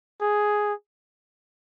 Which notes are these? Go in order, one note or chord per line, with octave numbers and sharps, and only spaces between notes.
G#4